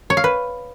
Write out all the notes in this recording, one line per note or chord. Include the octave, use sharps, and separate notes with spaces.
C#5
F5
B4